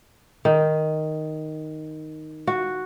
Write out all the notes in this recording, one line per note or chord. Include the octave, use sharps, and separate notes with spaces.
D#3
F#4